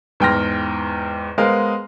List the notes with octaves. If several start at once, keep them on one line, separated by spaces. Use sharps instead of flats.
E2 G#2 G5 C6 F6 A#6
G#3 B3 A#4 C5 D#5 F5